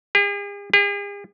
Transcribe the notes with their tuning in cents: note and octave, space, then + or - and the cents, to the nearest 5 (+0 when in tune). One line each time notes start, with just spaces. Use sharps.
G#4 -45
G#4 -45